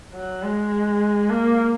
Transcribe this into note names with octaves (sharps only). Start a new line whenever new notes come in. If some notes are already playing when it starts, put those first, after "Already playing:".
F#3
G#3
A#3